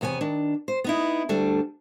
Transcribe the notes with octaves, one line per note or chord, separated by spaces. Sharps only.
E2 C3 B3 C#5 G#5
D#3 D4
C5
B3 D#4 E4
D2 G3 D4 A4